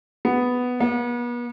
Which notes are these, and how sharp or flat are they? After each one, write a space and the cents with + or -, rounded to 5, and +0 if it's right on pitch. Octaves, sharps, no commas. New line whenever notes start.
B3 +5
B3 -40